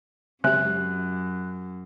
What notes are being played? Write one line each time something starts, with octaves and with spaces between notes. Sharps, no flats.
F#2 C#3 G#3 C4 G4 E5 F#6